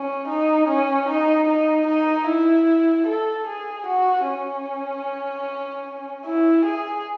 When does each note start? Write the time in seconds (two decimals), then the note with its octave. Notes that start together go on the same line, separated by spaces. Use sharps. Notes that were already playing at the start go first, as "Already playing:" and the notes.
Already playing: C#4
0.28 D#4
0.68 C#4
1.08 D#4
1.47 D#4
1.87 D#4
2.28 E4
3.07 A4
3.47 G#4
3.87 F#4
4.26 C#4
6.26 E4
6.65 G#4